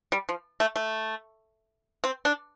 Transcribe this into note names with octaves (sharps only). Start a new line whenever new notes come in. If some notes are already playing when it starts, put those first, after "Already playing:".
G3
F3
A3
A3
C4
D4